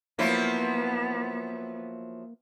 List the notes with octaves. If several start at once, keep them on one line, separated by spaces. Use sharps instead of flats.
F3 F#3 A#3 B3 E4